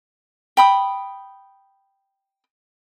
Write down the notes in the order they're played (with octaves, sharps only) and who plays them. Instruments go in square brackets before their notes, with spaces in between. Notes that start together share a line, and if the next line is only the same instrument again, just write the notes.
[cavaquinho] G5 B5 D#6